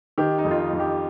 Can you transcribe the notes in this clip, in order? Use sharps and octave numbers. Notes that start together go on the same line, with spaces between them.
D#3 G4
D#4
F2
F4
D#4
F2
G4